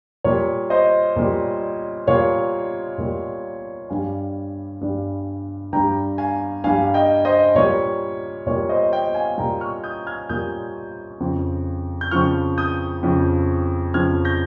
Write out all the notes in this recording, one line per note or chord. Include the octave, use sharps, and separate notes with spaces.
A#2 G3 C#5
C5 D#5
A#2 G3
A#2 G3 C#5 F5
A#2 G3
G2 G3 F5 G#5
G2 G3
G2 G3 G5 A#5
F5 G#5
G2 G3 F5 G#5
F5
D#5 G5
C5 D#5
A#2 G3 C#5
A#2 G3 C#5
C5 D#5
D#5 G5
F5 G#5
A#2 G3 G5 A#5
C#6 F6
D#6 G6
F6 G#6
A#2 G3 D#6 G6
F2 C#3 F3
G6
F2 C#3 F3 C#6 F6
D#6 G6
F2 C#3 F3
F2 C#3 F3 F6 G#6
G6 A#6